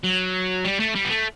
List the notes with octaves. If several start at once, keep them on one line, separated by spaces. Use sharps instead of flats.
F#3
G3
A3
G3
B3
A3